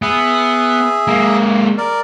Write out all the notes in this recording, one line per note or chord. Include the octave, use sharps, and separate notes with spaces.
B3 G#4 E5
G#3 A#3
A#4 D5